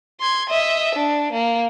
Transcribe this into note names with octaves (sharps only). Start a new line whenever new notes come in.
C6 G#6
D#5 E5
D4
A#3